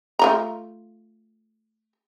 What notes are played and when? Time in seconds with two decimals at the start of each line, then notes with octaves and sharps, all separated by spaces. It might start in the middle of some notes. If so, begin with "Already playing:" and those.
0.19 A3 F4 A#5